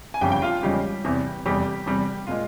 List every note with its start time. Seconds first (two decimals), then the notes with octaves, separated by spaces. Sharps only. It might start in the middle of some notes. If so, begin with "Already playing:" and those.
0.14 G#5
0.21 G1 F2 C#3 G3 G4 G5
0.32 G5
0.42 F4 F5
0.63 E2 C#3 F3 G3 G#3 G4
1.05 E2 C3 E3
1.45 F1 E2 C3 G3 G4
1.86 E2 C3 G3
2.27 A#2 G#3 F4